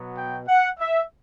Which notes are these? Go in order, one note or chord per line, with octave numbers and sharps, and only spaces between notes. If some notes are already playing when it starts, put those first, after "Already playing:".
Already playing: B2 F#3 B3
G5
F#5
E5